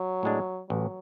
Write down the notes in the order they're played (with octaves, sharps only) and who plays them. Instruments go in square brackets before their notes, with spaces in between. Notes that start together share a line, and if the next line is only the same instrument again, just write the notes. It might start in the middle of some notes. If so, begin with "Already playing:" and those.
Already playing: [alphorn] F#3
[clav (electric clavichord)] A2 G#3 D4
[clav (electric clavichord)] A1 [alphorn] F#3